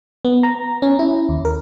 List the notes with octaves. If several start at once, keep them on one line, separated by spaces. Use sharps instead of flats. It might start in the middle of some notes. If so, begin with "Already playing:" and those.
B3
A#5
C#4
E4
D#2
A#4